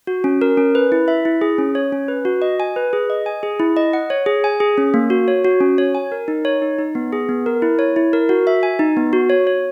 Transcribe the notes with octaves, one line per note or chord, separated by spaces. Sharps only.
F#4
C#4
A#4
C#4
B4
E4
E5
E4
G#4
C#4
C#5
C#4
B4
F#4
D#5
G#5
B4
G#4
D#5
G#5
G#4
E4
D#5
F#5
C#5
G#4
G#5
G#4
C#4
A#3
F#4
C#5
F#4
C#4
C#5
G#5
A#4
D#4
C#5
D#4
D#4
B3
G#4
B3
A#4
E4
C#5
E4
A#4
F#4
E5
G#5
D#4
B3
F#4
C#5
C#5